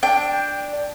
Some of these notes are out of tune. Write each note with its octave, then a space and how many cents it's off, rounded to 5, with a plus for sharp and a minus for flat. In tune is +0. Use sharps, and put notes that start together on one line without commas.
D4 +0 G5 +15